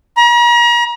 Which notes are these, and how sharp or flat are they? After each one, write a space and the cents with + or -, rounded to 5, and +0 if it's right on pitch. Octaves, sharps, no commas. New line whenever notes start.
A#5 +40